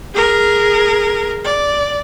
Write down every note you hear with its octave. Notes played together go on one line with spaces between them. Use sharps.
G#4 A#4
D5